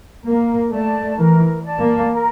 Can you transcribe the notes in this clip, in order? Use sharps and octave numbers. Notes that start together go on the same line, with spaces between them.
A#3 A#4
A3 D5 A5
E3 A#4
D5 A5
A#3
A#4